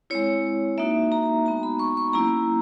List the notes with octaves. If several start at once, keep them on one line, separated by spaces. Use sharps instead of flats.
G#3 C4 E4 C#5
A#3 D#4 F#4 E5
A#5
G#3 B3 D#4 F#4 A#5
B5
C#6
C#6
F#3 A#3 C#4 E4 A#5